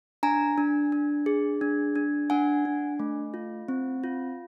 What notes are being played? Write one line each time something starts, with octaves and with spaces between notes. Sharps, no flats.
D4 G#5 A#5
D4
D4
G#4
D4
D4
D4 F#5 G#5
D4
A3
F4
C4
F4